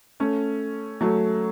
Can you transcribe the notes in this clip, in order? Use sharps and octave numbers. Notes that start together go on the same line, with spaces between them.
A3 C#4
F#3 A3